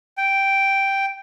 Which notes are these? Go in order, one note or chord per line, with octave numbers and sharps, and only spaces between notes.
G5